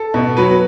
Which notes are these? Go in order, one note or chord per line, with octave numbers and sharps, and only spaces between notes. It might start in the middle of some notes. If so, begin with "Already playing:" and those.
Already playing: A4
B2
F#3 B4